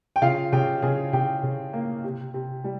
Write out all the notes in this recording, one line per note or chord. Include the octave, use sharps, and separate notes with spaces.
G5
C#3 F4 F5
C#3 G4 G5
C#3 G#4 G#5
C#3 G4 G5
C#3
A#3
C3
C3
G3